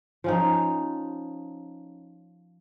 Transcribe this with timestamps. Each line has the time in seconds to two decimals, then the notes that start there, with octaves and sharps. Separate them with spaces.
0.24 F3 C#4 D#4